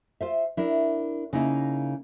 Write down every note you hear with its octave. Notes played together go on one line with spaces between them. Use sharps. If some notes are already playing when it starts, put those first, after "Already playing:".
F4 C5 E5
D4 E4 A#4
C#3 A#3 D#4 E4